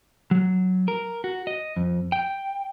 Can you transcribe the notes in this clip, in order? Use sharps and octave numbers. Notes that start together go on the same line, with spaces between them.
F#3
A#4
F#4
D#5
F2
G5